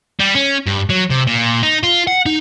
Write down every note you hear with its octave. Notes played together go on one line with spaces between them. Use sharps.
G3
C#4
G2
F#3
C3
A#2
D#4
F4
F#5
D#4